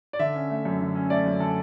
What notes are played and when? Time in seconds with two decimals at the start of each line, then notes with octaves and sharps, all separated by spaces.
0.13 D5
0.19 D3 E5
0.35 C#4
0.50 A3
0.65 F#2
0.81 D3
0.95 C#4
1.10 A3 D5
1.26 F#2
1.40 D3 A4